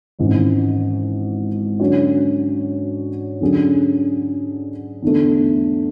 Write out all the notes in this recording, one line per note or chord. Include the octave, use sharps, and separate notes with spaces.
G#1 G#2 E3 G#3 C#4
D3 F#3 C#4 F#4 C#5
D3 F#3 C#4 G#4
E2 D3 A3